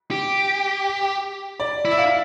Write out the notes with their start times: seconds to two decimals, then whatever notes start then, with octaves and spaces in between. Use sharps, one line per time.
0.11 G4
1.60 D5
1.85 E4
1.91 E5
1.98 F5